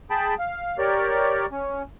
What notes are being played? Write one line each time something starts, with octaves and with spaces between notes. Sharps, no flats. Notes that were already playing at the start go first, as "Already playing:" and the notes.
G#4 G5 A5 B5
F5
G4 A#4 C#5 D5
C#4